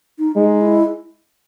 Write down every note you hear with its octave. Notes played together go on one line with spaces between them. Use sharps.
D#4
G#3 D#4
E4